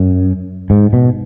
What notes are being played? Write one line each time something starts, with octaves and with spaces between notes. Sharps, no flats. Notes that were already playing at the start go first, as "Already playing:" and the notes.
Already playing: F#2
G#2
B2